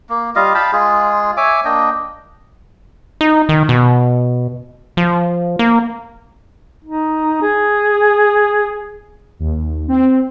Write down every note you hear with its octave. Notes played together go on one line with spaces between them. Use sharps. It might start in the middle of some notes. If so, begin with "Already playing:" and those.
A#3
G3 F4 D#5 F5
F5 G5 A5 B5
G#3 F4 G#4
C#5 E5 G#5 D6
A#3 D4 D#5 G5
D#4
D#3
B2
F3
A#3
D#4
G#4
D#2
C4